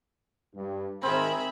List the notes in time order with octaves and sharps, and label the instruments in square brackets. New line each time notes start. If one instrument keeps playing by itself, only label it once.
[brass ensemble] G2
[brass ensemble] G#1 G#3 A#4 [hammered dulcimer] C4 [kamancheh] G#4 E5 [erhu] B5